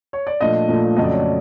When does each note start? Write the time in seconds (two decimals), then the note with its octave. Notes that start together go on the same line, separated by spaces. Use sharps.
0.13 C#5
0.27 D5
0.41 A#2 F3 A3 D4 D#5
0.69 A#2 F3 A3 D4
0.96 F2 C#3 F#3 A3 D#5
1.04 D5
1.12 C#5
1.20 D5